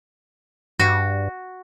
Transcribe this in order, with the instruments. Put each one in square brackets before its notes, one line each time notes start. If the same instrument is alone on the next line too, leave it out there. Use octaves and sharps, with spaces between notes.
[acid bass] G2 [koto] F#4